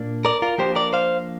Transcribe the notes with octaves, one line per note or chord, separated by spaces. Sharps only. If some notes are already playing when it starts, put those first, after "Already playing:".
Already playing: A#2 A#3 D4
A#4 D5
F4 A#4
F3 A#3 D4 G4 C5
A#4 D5
C5 F5